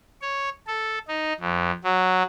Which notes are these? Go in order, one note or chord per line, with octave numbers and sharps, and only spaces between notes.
C#5
A4
D#4
F2
F#3